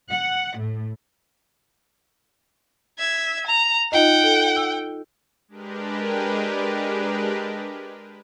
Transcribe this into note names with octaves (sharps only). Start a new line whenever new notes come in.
F#5
A2
E5 G#6
A#5
D#4 F4 D#5 F#5 G5
A4
E6
G#3 D4 G4 A#4 B4